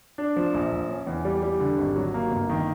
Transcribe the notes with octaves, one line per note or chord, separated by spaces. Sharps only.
D4
F3
A#1
A#1
C#4
E2
G3
G3
D3
G#1
F#3
A#3
G1
D#3